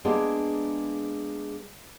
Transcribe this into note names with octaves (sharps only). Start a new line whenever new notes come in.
G#3 A#3 B3 D4 G#4